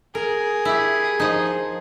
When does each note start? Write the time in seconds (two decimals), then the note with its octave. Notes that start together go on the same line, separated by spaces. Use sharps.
0.15 G#4 A#4
0.65 E4 G4
1.20 F3 D#4